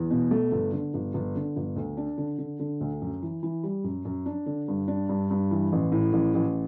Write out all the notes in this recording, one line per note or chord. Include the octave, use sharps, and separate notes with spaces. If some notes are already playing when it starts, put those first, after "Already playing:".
Already playing: E2
B2
A3
G1
D3
G1
G1
D3
G1
D2
D4
D3
D3
D3
D2
F#2
E3
E3
G3
F#2
F#2
D4
D3
G2
D4
G2
G2
E3
A1
A2
A1
A1